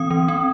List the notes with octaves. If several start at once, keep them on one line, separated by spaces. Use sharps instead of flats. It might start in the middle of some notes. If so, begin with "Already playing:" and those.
Already playing: E3 C4 D#6
E3
C4